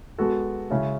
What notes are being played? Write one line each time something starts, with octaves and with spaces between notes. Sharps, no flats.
G#3 B3 F#4 A4
C#3 G#3 C#4 E4